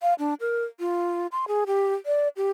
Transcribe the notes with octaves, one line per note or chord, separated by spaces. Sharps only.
F5
D4
A#4
F4
C6
G#4
G4
D5
G4